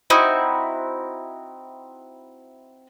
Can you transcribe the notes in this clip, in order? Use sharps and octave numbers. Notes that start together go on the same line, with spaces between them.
C4 D#4 E4 F#4